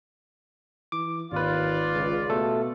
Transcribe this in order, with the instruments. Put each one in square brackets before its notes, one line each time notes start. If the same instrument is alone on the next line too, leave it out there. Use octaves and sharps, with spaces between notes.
[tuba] E3 [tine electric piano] D6
[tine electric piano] G#1 B4 [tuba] D#2 [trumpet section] F4 D5
[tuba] C#2
[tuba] B2 [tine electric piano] A3 A4